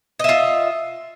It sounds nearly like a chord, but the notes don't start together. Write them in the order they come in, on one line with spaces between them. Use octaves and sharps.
D#5 E5 F4